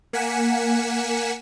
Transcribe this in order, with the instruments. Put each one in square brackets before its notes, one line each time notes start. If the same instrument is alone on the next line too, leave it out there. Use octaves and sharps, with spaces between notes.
[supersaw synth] A#3 F#5 G#5 B6 C#7 E7